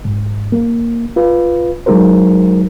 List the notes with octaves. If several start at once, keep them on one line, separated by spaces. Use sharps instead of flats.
G#2
A#3
F4 B4
F#3 G#3 D#4 F#4 A#4 C5